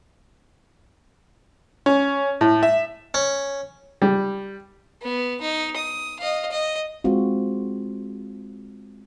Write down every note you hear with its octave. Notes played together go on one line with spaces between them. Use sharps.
C#4
A2
E5
C#4
G3
B3
D#4
D#6
D#5 F5
D#5
G#3 C4 F4 F#4